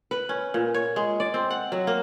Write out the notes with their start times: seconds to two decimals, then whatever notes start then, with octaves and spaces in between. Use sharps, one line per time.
0.11 B4
0.29 C#4
0.54 A#2
0.74 C#5
0.96 G#3
1.20 D5
1.34 C4
1.51 F#5
1.72 F#3
1.87 A#3